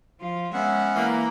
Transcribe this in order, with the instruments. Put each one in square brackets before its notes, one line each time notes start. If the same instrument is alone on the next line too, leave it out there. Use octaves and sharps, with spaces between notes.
[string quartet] F3 F4
[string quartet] G#3 E5 [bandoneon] B3 C#4 F#5
[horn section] E3 A#3 [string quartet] A#5 B5